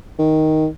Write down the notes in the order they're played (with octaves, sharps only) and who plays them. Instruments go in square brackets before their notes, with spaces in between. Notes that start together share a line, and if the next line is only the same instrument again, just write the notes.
[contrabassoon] D#3